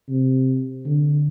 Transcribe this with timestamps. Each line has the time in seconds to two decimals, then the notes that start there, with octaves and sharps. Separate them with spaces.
0.09 C3
0.86 D3